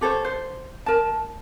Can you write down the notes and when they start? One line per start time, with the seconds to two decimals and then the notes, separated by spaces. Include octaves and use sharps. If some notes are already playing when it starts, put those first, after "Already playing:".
0.01 G4 A4 C5 C#5
0.25 C5
0.86 A#4 A5